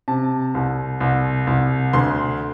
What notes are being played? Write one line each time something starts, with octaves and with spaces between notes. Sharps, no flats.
C3 A5
C2
C2
C2
D2 C6